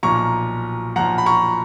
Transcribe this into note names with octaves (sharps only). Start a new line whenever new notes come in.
B1 A#2 F3 A#5 C#6
B1 A#2 F3 F#5 A#5
B5
A#5 C#6